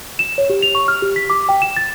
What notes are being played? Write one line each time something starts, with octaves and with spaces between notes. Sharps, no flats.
E7
C#5
G4
F7
C#6
F6
G4
B6
D6
G5
E7
A6